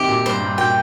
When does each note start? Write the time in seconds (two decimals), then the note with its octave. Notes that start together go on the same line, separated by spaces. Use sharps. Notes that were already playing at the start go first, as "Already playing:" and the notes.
Already playing: C3 D#3 C4 G4
0.09 A#2
0.25 G2 C5
0.42 G2
0.58 A#2 G5